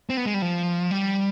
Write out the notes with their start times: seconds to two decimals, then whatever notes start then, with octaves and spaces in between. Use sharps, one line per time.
0.10 C4
0.17 B3
0.26 G#3
0.34 G3
0.42 F3
0.91 G3